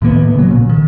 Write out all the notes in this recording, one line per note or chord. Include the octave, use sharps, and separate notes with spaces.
A2 D#3 A#3 B3
C#3 F#3
A#2
D#3